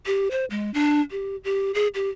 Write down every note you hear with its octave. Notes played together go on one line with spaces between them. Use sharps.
G4
C5
G#3
D4
G4
G4
G#4
G4